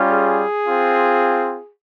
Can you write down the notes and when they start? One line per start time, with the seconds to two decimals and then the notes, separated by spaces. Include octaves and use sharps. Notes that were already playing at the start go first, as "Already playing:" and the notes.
Already playing: G3 C#4 F4
0.09 G#4
0.66 C4 F4